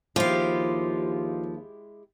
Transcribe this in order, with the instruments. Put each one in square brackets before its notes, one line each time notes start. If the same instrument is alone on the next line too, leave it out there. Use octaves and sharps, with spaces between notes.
[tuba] D#2 [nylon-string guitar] F3 [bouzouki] G#3 E4 G4 [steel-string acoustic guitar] F4 F5